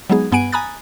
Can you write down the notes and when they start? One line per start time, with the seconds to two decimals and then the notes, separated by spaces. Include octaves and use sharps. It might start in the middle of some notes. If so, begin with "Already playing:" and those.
0.10 F#3 G#3 B3 D#4 G#4
0.32 G2 B3 F#5 G#5 D7 D#7
0.52 G#5 A#5 B5 D#6 F#6 A6